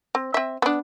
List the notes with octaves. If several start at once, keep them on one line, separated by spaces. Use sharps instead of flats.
C4
C4 E5
B3 D4